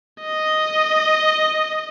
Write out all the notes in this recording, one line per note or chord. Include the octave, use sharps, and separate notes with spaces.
D#5